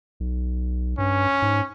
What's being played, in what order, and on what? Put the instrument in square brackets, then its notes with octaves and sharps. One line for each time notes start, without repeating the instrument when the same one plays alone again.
[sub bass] B1
[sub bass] G2 [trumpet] C#4
[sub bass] G#2